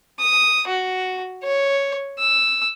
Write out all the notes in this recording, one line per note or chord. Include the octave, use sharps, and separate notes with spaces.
D#6
F#4
C#5
E6